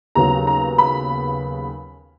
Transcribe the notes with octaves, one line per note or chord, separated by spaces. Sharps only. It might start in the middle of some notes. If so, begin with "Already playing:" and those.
D#2 C#3 F#3 B3 A#5
A#5
B5